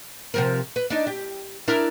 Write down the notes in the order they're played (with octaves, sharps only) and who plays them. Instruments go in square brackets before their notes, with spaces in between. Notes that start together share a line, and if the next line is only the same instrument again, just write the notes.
[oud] C3 F3 A#4
B4
D4 D#4
G4
D4 E4 A#4